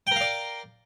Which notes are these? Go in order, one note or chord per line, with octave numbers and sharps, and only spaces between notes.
A#4 D5 F5 G5